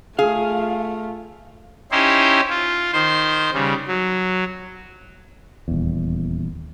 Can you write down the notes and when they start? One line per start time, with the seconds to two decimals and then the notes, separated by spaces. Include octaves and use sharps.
0.19 A3 F4 G#4 F5
1.91 C#4 D#4 E4 G4 C5
2.50 F4
2.93 D#3 C5 C6
3.53 C#3 G3
3.88 F#3
5.68 D#1 E2